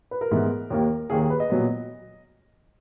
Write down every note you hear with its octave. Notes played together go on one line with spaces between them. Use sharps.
B4
A#4
G#2 E3 B3
D#2 D#3 A#3
D#2 D#3 A#3 G#4
G#4
B4
D#5
A#2 F#3 B3